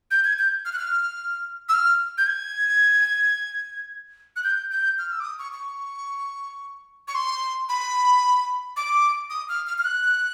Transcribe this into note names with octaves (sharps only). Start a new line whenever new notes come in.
G6
G#6
G6
F6
F#6
F6
E6
F6
G6
G#6
F#6
G6
G6
F6
E6
D6
D#6
C#6
C#6
C#6
C6
B5
D6
D#6
F6
F6
F6
F#6